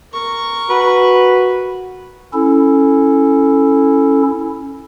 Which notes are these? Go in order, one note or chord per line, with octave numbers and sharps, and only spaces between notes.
A#4 C#6
F#4 B4
C#4 E4 A4